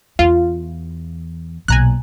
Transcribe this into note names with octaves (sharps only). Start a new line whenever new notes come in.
E2 F4
B1 A#2 G#5 A#5 F#6